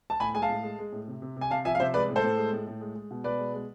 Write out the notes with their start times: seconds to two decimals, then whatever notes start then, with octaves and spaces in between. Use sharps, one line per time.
0.10 A5
0.20 A2 G#5 B5
0.34 G#3 G#5
0.42 F5 A5
0.49 A2
0.63 G#3
0.79 G#3
0.92 A2
1.08 C3
1.22 C3
1.36 C3 G#5
1.51 C3 F5 A5
1.65 F3 E5 G#5
1.75 F5
1.80 C3 C5 E5
1.94 G#3 B4 D5
2.09 A2
2.16 A4 C5
2.23 A2
2.37 G#3
2.52 A2
2.67 A2
2.81 G#3
2.95 G#3
3.11 B2
3.24 B2 B4 D5
3.39 G#3
3.54 G#3